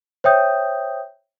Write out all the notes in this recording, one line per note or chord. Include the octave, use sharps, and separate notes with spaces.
C5 C#5 E5 G5 D#6 G6